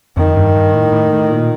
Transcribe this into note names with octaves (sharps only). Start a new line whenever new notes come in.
F2 D#3
G2
G2
A2
A2
A2
A#2